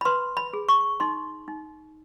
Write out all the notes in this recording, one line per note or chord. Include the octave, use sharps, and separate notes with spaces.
B5
B4 C6
B5
G#4
C#6
D#4 C6
D#4